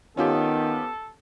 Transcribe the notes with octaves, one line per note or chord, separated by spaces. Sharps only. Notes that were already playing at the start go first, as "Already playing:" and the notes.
D#3 B3 C#4 F4 G4 A4